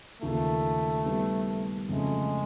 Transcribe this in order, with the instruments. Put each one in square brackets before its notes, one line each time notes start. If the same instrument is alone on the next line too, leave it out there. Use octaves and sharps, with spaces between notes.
[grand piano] D#2 C#3 F3 A#3 [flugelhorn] A3
[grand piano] D#3 G3 B3
[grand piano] F2 C#3 F#3 A3 C#4 [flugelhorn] G#3